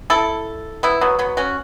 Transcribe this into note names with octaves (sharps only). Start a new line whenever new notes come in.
E4 A4
B3 E4
F#3 B3
F#3 B3
C#4 F#4